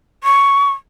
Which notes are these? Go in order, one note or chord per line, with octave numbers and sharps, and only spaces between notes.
C#6